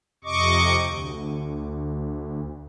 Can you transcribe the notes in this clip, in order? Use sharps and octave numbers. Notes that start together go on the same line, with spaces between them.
F2 C3 D#5 C#6 D6
D2